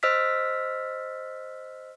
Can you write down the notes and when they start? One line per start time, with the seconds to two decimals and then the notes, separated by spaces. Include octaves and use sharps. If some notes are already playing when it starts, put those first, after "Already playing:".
0.03 C5 D#5 E6 F6 B6